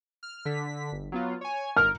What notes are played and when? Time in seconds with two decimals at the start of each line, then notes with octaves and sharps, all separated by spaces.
0.23 F6
0.45 D3 B6
0.92 G1
1.12 F#3 B3 F4
1.41 C#5 G#5
1.77 G1 A#4 F6